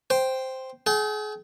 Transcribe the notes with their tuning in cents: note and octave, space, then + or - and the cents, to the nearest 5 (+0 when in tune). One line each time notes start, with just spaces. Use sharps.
C5 +0 G5 +0
G#4 +35 G5 -30